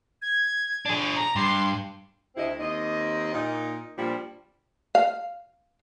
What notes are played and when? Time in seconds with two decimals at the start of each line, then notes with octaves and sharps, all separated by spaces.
0.22 G#6
0.86 D4 G#4
1.16 A#5
1.36 G2 C6
2.36 D2 C3 C4 E4 D#5
2.59 D#2 C4 D#5
3.34 A#2 D#4
3.97 A#2 F3 G3 A#3 D4
4.95 F5